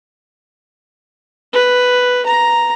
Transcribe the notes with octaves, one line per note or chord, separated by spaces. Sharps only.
B4
A#5